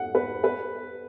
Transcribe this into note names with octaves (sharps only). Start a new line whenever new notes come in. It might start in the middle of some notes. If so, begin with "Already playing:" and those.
Already playing: F#5
B4
B4